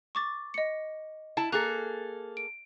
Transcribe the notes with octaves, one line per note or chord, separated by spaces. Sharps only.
C#6 D6 A6
D#5 C#7
E4 A5
A#3 G#4 A4 F#6 F7
D7